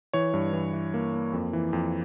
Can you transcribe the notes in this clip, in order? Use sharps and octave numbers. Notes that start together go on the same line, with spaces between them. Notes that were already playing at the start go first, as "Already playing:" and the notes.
E3 C#5
G2
E3
E3
A#3
A#3
F2
E3
F2